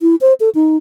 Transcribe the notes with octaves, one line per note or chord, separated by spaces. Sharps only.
E4
C5
A4
D#4